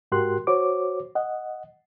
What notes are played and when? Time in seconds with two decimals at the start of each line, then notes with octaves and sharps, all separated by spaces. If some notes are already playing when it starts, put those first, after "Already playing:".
0.12 G#2 F#4 G4 A#4 C6 F#6
0.47 F#4 C5 C#5 D6
1.15 D#5 F#5